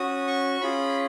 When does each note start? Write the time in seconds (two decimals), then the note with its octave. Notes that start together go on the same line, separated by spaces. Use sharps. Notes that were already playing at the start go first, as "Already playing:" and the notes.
Already playing: C#4 F#4 D#6
0.27 C#6
0.61 C#4 F4 G#4 B5